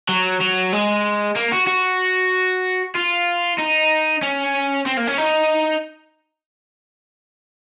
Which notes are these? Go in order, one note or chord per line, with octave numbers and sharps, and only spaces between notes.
F#3
F#3
G#3
A#3
F#4
F#4
F4
D#4
C#4
C4
A#3
C#4
D#4